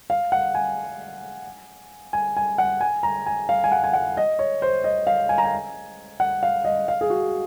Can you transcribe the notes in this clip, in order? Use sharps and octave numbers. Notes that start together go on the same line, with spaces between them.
F5
F#5
G#5
G#5
G#5
F#5
G#5
A#5
G#5
F5
G#5
F#5
G#5
F#5
D#5
C#5
C5
D#5
F5
G#5
A#5
G#5
F#5
F5
D#5
F5
G#4
F#4